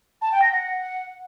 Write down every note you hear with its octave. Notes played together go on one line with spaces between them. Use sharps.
A5
G5
A#6
F#5